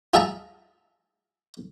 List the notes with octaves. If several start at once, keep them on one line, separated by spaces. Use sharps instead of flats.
F4 G#4 E5 F#5 A5 A#5